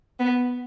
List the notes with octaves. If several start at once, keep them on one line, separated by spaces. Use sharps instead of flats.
B3